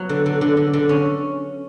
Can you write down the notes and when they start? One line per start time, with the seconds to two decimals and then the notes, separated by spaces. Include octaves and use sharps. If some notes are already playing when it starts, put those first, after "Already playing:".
Already playing: F#3 B3
0.09 D3
0.26 D3
0.41 D3
0.57 D3
0.73 D3
0.89 C#4